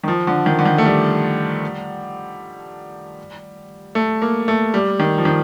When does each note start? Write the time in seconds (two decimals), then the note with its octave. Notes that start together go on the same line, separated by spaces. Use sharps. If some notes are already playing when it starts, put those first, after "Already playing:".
0.03 D#3
0.08 F3
0.27 D3
0.46 D#3
0.59 D3
0.65 D#3
0.78 A3
0.85 G3
3.95 A3
4.22 A#3
4.48 A3
4.74 G3
5.00 D#3
5.18 F3
5.25 D#3